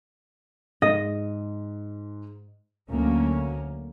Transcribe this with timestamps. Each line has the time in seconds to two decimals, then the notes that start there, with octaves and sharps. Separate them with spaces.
0.82 G#2 D#5
2.89 D2 F#3 A#3 C#4